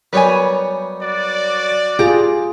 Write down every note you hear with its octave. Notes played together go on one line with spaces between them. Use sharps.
F#2 G3 B3 B4 C#5 G#5
F#4 D5
F4 G4 G#4 A#5